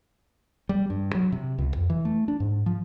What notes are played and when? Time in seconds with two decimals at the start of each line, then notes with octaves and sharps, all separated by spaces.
0.69 G3
0.90 G2
1.15 F#3
1.32 C3
1.58 C#2
1.76 F2
1.90 E3
2.05 A3
2.28 D4
2.40 G#2
2.66 F3